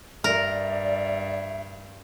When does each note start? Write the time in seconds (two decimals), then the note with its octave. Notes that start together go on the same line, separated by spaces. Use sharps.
0.24 G2 A#4 D5 E5